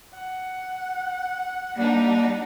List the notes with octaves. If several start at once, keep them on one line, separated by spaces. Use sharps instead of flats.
F#5
G3 A#3 D4 D#4